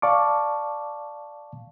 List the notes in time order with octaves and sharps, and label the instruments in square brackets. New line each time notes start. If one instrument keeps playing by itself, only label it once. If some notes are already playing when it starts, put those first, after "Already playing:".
[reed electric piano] D5 F5 A5 C#6 D6